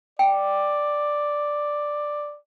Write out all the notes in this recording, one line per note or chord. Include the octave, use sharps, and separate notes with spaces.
D5 G5